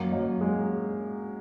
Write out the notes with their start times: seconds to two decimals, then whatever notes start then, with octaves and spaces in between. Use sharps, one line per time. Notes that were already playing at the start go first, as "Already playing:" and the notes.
Already playing: F#2 A#3
0.12 F#2
0.41 G#3